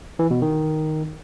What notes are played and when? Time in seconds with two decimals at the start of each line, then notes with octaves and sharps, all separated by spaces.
0.19 E3
0.31 B2
0.42 D#3